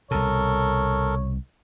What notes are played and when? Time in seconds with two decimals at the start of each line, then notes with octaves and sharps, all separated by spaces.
0.11 C2 B2 A4 A#4 C#5